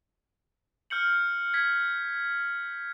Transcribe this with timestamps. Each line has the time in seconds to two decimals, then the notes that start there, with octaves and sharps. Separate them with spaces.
0.90 F6 G6 C#7 F#7
1.54 G#6 B6